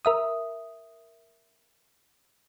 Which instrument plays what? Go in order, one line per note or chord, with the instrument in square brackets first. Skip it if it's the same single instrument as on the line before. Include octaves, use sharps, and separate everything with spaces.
[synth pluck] A#4 E5 D#6